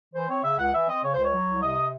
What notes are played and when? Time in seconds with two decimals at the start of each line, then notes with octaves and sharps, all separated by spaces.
0.14 E3 C5
0.29 C4 C#5
0.43 C#3 E5
0.58 C#2 F#5
0.73 E3 E5
0.88 C4 D#5
1.03 C#3 C#5
1.14 C#2 C5
1.25 C#5
1.32 F#3
1.47 C2
1.62 C3 D#5